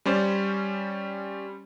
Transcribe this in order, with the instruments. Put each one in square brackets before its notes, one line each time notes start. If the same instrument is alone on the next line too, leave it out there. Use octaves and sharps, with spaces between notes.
[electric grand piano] G3 C#4 C5 D5